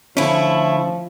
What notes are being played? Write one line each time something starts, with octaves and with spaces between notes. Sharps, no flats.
D3 F3 A3 C#4 E4